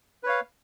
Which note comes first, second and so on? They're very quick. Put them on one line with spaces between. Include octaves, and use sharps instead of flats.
B4 C#5 F5